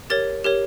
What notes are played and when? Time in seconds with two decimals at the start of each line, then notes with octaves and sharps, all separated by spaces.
0.10 G4 A#4 C#5 A6
0.44 G4 A#4 C#5